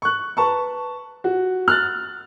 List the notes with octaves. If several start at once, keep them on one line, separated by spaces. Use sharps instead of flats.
C#6 F#6
B4 A5 C#6
F#4
F6 F#6 A6